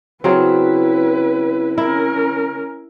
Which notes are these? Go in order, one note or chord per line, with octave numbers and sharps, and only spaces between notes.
C#3 F#3 C4 E4 B4
C#4 E4 A#4